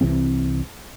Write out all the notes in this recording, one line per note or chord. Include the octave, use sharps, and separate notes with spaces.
C2 C3 E3 C4